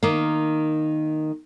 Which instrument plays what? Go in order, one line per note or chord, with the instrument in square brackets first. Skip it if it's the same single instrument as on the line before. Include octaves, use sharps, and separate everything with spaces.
[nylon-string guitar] D#3 A#3